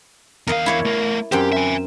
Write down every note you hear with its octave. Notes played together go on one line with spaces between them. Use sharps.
E2 A#4 D#5 F5
E4 C#5 D5
A3 A#4
F#2 C4 G4
E5 G#5